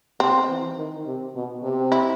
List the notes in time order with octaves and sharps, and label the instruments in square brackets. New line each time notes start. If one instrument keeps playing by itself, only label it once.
[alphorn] C3 [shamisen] C4
[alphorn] E3
D#3
C3
B2
C3
[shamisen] E4